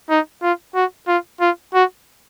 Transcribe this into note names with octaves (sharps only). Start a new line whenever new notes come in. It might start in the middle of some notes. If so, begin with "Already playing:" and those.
D#4
F4
F#4
F4
F4
F#4